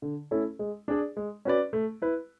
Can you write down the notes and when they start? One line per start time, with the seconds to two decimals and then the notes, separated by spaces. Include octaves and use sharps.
0.02 D3
0.31 A3 C#4 E4 A4
0.59 G#3
0.88 D4 G#4 D5
1.17 G#3
1.45 C#4 F#4 B4 D5
1.73 A3
2.02 E4 B4